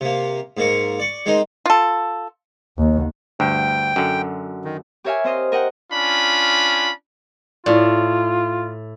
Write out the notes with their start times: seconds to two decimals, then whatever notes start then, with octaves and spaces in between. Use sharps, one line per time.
0.01 C3 A#3
0.57 G#2 A#3 A#4 C#6
1.00 D5 C#6
1.26 G#3 C4 D#4 A#4
1.66 F4 A4
2.78 D#2
3.40 D2 G2 G5
3.96 F#2 D3
4.65 D#3
5.04 G4 A#4 C#5 E5 F5 G#5
5.24 C4 C5 D#5 F5
5.52 A#4 D#5 F#5 G5 A#5
5.91 C#4 D4 F4 B5
7.66 A2 E4 F4 D5